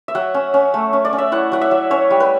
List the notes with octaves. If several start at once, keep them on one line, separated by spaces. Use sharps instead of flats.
E5
F#3 F#5
C#4
C#4
A3
C#4
D5
C#4
E5
E4 F#5
F#3 F#5
E5
F#3
C#4 C#5
G3
B4